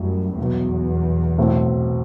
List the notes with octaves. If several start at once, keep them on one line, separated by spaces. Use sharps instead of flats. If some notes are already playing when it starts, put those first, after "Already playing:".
Already playing: A1 F#2 A2 G3
B1 E2 B2 F#3
B1 A2 F#3 C4 E4